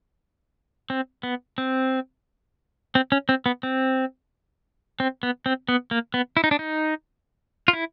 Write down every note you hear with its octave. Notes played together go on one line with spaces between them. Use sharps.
C4
B3
C4
C4
C#4
C4
B3
C4
C4
B3
C4
B3
A#3
B3
E4
D#4
D4
D#4
F4
E4